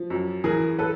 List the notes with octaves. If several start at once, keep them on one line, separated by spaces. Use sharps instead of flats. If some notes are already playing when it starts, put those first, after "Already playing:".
Already playing: F3
F#2
E3 G#4 A#4
A4 B4